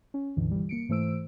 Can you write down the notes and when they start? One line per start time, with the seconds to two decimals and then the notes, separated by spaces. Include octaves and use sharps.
0.14 C#4
0.36 C#2 G2 B2 D3 E3
0.51 E3 G3
0.69 A#3 C#7 D7
0.89 G#2 E3 A3 C5 E6 D7